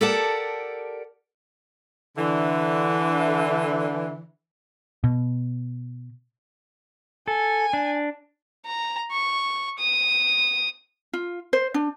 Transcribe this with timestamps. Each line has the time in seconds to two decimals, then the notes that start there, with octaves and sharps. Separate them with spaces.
0.01 G4 A4 A#4 D5 F#5 A5
2.17 D3 E3
5.04 B2
7.28 A4 G#5
7.73 D4
8.66 A#5
9.11 C#6
9.79 D#6
11.13 F4
11.53 C5
11.74 D4